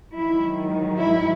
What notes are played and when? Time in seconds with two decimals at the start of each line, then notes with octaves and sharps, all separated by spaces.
0.17 G#2 D#3 F#3 E4
0.96 E4